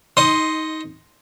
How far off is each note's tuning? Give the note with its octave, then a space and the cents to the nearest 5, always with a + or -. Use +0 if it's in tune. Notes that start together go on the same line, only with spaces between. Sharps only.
D#4 +20 D#5 +0 C6 +0